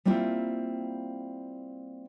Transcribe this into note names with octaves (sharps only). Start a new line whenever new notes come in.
G3 A#3 C4 E4 F4